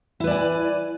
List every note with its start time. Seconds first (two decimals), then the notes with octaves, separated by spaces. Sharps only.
0.20 E4
0.24 B4
0.27 D5
0.31 G#5